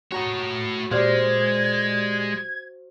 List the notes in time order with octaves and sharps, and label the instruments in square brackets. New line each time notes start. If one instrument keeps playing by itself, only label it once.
[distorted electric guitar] A3 C#5 [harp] F#4 A#5 D#6
[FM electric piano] A#2 G4 D5 [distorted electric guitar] G#3 [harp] C5 F5 [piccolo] G#6